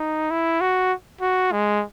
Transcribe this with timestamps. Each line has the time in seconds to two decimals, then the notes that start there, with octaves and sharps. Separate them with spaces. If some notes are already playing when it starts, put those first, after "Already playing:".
Already playing: D#4
0.30 E4
0.61 F#4
1.21 F#4
1.52 G#3